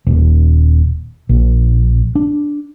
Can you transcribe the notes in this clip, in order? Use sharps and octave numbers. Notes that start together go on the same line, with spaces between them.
D#1
A#1
D4